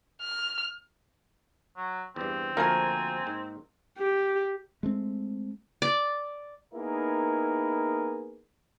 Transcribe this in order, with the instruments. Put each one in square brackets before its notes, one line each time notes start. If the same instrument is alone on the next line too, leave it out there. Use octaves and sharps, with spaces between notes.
[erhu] F6
[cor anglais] F#3
[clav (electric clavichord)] E2 G2 [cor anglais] C4
[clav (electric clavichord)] D2 F3 A3 [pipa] A#3 A#4 [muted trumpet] G#5
[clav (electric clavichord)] G#2
[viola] G4
[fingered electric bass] G#3 A3 C4
[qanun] D5
[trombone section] A#3 B3 D#4 E4 G#4 A#4